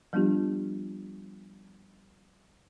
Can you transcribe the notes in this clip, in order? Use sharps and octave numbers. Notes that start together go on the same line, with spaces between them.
F3 G3 B3 D4 F4 G4